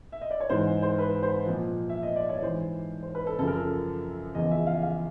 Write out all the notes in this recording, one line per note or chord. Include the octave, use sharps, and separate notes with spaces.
E5
D#5
D5
C#5
G#2 E3 C5
C5
B4
C5
A#2 F3
E5
D#5
D5
C#5
G#2 E3 C5
C5
B4
A4
F#2 C#3 F3 A4
A#4
A4
E2 C#3 F3 D#5
E5
F5
F5